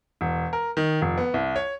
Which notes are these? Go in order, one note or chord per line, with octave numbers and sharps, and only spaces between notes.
E1
A#4
D#3
F1
B3
C2
C#5